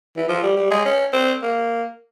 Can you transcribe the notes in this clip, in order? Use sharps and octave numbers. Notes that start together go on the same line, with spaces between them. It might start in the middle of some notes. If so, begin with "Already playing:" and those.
E3
F3
G3
G3
G#3
C#4
C4
A#3